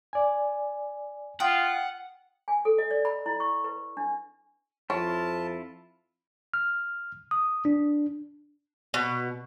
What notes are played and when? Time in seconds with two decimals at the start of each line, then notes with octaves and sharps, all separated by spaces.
0.13 D5 G#5
1.40 F4 F#5 G5 D#6
2.48 G#5
2.65 A4
2.78 D#5
2.91 D5
3.05 B5
3.26 E4
3.40 C#6
3.64 B4
3.97 D4
4.90 F2 E4 F4 C#5 A5
6.54 F6
7.31 D#6
7.65 D4
8.94 B2